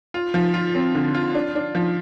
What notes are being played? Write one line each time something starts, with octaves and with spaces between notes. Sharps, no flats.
F4
F3
F4
C4
D3
F4
D4
D4
F3